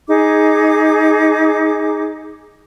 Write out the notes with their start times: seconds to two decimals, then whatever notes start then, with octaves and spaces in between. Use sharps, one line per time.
0.08 D#4 G#4 D6